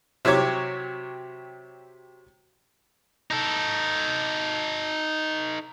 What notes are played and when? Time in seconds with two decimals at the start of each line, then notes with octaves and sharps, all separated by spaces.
0.25 C3 F#3 G4 C#5 D6
3.31 D#4 A4